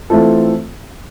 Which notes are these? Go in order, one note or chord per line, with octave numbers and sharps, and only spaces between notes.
E3 A3 C4 F4 A4